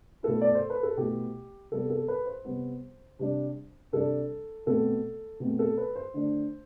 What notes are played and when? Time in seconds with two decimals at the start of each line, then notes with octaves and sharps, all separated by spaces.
0.23 B2 A3 E4 A4
0.41 D5
0.55 C5
0.70 B4
0.83 A4
0.97 B2 A3 E4 G4
1.71 C3 G3 B3 A4
1.90 A4
2.08 B4
2.26 C5
2.45 C3 G3 B3
3.19 C3 G3 D4
3.92 C3 G3 D4 A4
4.66 B2 A3 C4 A4
5.40 B2 A3 C4
5.59 A4
5.78 B4
5.96 C5
6.14 D3 A3 D4